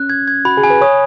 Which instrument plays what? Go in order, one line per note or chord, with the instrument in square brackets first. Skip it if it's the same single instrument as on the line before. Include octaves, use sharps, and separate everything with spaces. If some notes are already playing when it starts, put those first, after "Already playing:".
Already playing: [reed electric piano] C#4 [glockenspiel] F#6
[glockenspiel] G#6
G#6
[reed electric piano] F#4 [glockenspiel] B5
[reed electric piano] G#4
[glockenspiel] G#5
[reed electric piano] B4
[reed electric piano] C#5 [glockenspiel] D#6